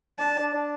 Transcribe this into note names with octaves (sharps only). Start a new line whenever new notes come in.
D4 A5
D4
D4